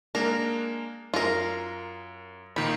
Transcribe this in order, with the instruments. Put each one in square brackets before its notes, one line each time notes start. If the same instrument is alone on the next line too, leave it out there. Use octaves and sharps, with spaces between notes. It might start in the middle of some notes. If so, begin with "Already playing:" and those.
[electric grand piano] G#3 A#3 D4 [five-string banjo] A#4
[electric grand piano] F#2 [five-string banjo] F4 A#4
[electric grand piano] A#2 D#3 A#3 [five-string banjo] B5